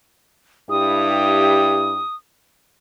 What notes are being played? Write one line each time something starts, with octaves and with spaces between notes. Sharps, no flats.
G2 E4 G4 D#6